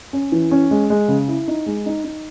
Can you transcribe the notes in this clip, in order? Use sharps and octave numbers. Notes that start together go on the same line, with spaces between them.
C#4
E3
C#4
G#3
G#3
C#3
E4
D#4
G#3
D#4
D#4